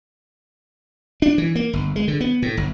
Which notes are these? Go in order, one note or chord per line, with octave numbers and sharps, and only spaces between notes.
D4
E3
A#3
G1
G#3
D3
B3
A2
G1